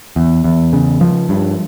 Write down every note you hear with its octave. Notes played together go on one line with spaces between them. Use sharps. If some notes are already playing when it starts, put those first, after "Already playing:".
E2
E2
C#3
F3
G2